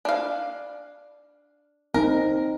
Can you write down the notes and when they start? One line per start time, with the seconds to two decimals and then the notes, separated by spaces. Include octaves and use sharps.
0.05 D4 F5
1.94 C4 D#4 A#4